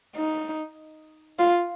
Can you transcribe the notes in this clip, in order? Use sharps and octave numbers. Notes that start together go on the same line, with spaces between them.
D#4
F4